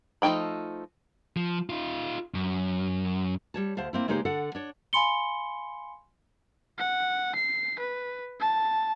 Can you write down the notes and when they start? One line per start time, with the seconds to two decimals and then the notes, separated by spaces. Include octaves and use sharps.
0.22 F3 A3 D#4 G5 B5
1.37 F3
1.70 D#4 F4
2.34 F#2
3.54 G3 C#5 A5
3.77 D2 C5 F5 A5
3.93 A#3 C4 E4
4.08 C#3 G#3 A#3 D#4 G4 C5
4.25 D3 A4 F#5
4.55 D4 C#5
4.93 F5 G#5 B5 C6 C#7 G7
6.78 F#5
7.35 C7
7.79 B4
8.40 A5